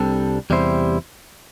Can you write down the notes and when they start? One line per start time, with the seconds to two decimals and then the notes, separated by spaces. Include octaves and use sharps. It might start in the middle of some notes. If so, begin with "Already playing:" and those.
Already playing: C2 C3 G3 D4 A4
0.50 E2 C3 G3 E4 C5